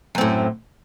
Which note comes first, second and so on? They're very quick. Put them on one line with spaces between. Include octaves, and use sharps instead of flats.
F#2 C4 A2